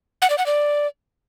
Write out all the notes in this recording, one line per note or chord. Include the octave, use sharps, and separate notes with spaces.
F#5
D5
F#5
D5